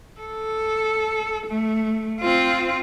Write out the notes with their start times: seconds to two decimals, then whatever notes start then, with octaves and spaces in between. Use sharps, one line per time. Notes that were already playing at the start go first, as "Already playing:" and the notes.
0.20 A4
1.47 A3
2.21 C4 F4